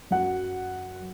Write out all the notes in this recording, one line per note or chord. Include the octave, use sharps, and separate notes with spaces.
F#2 F#4 F#5